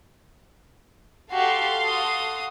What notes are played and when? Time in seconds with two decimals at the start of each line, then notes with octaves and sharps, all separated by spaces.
1.32 F#4 G4 A4 F5 C6
1.84 F#4 D#6